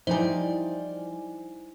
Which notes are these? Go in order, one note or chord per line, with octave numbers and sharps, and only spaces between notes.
F3 G3 D#4 E4 C5 D5 G#5